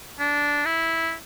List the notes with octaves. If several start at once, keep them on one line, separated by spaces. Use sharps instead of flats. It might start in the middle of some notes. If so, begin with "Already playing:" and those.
D4
E4